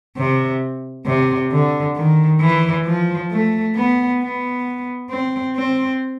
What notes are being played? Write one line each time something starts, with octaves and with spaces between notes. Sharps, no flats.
C3
C3
D3
D#3
E3
F3
A3
B3
B3
C4
C4